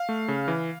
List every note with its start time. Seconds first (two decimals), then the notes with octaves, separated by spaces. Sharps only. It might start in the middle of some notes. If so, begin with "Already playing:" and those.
Already playing: F5
0.09 A3
0.28 C#3
0.48 E3